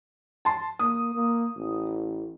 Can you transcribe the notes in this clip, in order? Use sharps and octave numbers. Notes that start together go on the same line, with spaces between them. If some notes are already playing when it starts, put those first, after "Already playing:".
A5 C6
A#3 D#6
A#3
A1